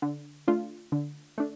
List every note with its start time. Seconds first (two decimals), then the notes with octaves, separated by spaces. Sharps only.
0.02 D3
0.47 A3 D4 F4
0.92 D3
1.38 A3 D4